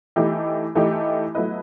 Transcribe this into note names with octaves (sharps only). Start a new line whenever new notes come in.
E3 A3 D#4 G4
E3 A3 D#4 G4
F#3 A3 E4 B4 D#5